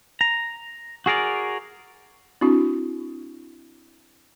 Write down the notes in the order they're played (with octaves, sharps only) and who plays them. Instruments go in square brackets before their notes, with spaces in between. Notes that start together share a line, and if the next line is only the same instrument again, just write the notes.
[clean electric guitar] A#5
F#4 G#4 A#4 D5
[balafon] C4 D4 E4 F#4